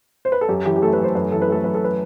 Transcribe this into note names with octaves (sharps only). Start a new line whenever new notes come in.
C5
B4
A4
F#2 G4
E3 G4
G4
A3 A4
B4
F#2 C5
F#2 B4
E3 A4
B4
A3 A4
F#2 B4
A4
B4